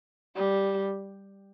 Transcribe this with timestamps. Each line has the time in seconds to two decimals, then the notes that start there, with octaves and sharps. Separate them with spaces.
0.36 G3